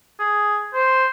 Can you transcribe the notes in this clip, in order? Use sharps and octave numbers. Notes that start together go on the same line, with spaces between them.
G#4
C5